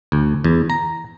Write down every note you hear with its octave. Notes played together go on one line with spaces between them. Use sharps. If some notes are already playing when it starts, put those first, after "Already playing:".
D2
E2
A#5